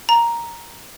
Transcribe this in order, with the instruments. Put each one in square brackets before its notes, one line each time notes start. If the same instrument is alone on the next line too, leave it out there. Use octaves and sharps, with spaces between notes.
[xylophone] A#5